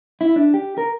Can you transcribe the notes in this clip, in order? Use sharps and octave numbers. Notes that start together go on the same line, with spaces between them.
E4
D4
G4
A#4